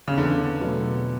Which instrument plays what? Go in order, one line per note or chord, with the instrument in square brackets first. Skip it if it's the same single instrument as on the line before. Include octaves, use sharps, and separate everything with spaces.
[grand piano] C#3
[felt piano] E2 [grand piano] D3
[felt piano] B2 F#3 A3